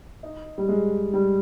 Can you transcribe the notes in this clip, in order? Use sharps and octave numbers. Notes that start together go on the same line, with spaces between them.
D#4
G3
G#3
G3